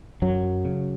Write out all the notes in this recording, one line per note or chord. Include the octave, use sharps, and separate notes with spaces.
F#2 F#3
C#3